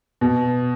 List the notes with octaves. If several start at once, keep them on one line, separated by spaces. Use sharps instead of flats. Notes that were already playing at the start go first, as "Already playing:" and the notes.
B2